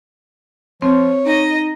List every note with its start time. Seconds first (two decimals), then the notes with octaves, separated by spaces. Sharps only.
0.82 F3 C4 C#5
1.26 D#4 D#5